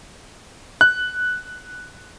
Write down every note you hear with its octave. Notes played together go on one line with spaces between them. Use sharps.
F#6